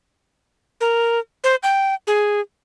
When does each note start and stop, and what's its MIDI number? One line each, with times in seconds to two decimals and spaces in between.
0.81 1.19 70
1.44 1.56 72
1.63 1.94 79
2.07 2.40 68